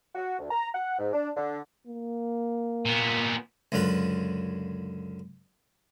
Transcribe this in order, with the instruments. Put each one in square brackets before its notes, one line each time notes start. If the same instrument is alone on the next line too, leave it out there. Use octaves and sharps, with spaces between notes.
[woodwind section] F#4
D2
A#5
F#5
G#2
D4
D3
[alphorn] A#3
[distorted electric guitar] A#2 B3
[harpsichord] C#2 F#2 D3 F4 B4